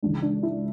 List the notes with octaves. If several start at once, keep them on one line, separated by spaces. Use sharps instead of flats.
C#2 C#3 E3 D4
D4
E4